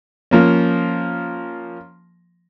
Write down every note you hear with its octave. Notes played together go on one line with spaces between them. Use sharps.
F3 A#3 C#4